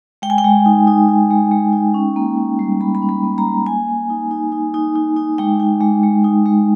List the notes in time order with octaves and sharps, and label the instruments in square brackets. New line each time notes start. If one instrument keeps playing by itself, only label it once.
[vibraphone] G#3 G5
G#5
G5
G#3
D#4
D#4
D#4
G#3
G#3
D#4
C#4
A#3
C#4
G3
G3 B5
B5
C#4
B5
A#3
A#5
G3
A#3 G#5
A#3
D#4
D#4
D#4
D#4
D#4
D#4
G#3 G5
D#4
G#3
G#3
D#4
G#3